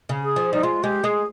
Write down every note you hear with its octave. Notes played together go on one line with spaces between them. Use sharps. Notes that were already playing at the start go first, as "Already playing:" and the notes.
C#3
G#4
F3
G3 D#4
G#3 F4
G#3 G4
G#3 G#4